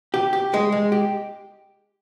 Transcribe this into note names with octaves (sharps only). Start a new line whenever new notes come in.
G4
G4
G#3
G#3
G4